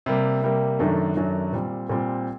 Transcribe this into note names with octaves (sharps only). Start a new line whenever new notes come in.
C3 G3 A#3
C3 G3 A#3
F#2 D#3 F#3 A3 D4
F#2 D#3 F#3 A3 D4
A#2 G3 C4
A#2 G3 C4